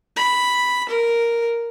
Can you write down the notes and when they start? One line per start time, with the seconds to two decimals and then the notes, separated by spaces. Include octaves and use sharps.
0.16 B5
0.89 A#4